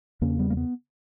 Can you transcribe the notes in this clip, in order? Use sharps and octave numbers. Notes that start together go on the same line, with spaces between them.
E2 C#3 A#3 C#4
G3 B3
A#3
B3